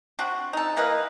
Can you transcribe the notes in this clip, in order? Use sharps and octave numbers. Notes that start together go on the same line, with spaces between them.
C4 D4 F#4
D#4 A4
E3 A#3 B4 D#5